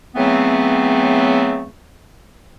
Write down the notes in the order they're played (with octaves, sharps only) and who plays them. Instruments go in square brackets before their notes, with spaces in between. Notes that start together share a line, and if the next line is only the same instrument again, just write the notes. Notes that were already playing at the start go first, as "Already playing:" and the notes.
[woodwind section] C#3 E3 F#3 A3 B3 C4